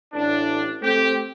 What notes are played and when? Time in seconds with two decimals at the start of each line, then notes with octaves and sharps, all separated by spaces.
0.13 A1 D4
0.82 A3 C4 G4